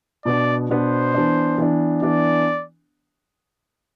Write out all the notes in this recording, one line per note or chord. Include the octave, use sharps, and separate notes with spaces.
B2 B3 D4 D5
B2 B3 D4 C5
E3 B3 D4
E3 B3 D4
E3 B3 D4 D5